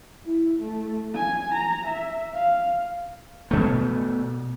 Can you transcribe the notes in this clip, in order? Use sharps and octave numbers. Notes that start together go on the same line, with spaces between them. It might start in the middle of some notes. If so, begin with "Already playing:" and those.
E4
A3
G#5
A#5
E5
F5
B2 A3